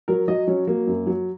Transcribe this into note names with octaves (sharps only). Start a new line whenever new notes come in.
F#3 A#4
F#3 D#5
F#3 C#4
F#3 A#3
F#2
F#3